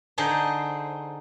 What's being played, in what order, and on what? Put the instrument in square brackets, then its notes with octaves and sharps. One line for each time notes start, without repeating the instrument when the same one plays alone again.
[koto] D3 D#4 G#4 C5